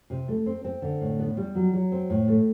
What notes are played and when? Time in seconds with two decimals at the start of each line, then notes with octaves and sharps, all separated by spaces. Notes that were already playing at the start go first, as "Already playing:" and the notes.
0.10 C3
0.28 A3
0.46 C4
0.64 C4
0.82 D3
1.01 A2
1.19 B3
1.37 G3
1.55 F#3
1.73 F#3
1.92 C4
2.10 A2
2.28 A3